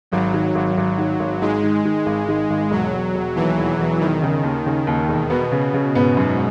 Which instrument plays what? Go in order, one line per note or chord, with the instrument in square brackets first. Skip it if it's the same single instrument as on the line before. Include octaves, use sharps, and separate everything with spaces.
[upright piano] G#1 [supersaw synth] F#3
[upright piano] D#3
G#1
G#1
D#3
G#1
[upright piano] G#2 [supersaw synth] G#3
[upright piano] D#3
D#3
G#1
D#3
G#1
[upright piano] E1 [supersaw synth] F#3
[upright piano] E1
E1
[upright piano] D#2 [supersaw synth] E3
[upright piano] E1
E1
[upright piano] E1 [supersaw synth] D#3
[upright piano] C#3
D#2
C#3
D#2
E1
[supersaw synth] B2 [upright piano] B3
[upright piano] C#3
C#3
[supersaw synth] G#2 [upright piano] B3
[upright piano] F#2